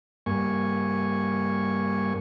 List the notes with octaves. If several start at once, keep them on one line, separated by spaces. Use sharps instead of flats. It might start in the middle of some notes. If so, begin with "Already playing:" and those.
G2 A#3 G#5 C#6